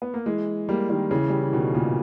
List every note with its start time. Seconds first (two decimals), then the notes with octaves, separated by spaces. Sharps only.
0.02 B3
0.14 A#3
0.26 E3 G#3
0.69 G3 A#3
0.90 D#3 G3
1.11 C#3 E3
1.30 G3
1.41 E3
1.53 B2 D#3
1.74 A#2 C#3